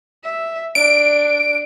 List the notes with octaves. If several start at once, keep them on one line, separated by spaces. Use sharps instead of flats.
E5
D4 D7